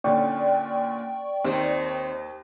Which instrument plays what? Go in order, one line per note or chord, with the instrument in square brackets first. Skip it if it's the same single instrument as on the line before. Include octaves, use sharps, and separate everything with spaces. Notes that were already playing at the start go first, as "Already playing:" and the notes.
[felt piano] A#2 D3 C#4 [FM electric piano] D5 G5 C#6
[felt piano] D#2 [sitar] D#3 C4